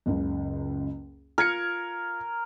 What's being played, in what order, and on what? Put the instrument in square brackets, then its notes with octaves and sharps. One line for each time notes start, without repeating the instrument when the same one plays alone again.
[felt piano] F#1 C#2 C#3
[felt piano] F4 G#6 C#7 [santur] A#4